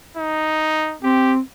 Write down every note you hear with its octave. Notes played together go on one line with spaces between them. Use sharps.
D#4
C4 G4